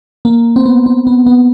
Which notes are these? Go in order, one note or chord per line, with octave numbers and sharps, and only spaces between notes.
A#3
C4
B3
C4
B3
B3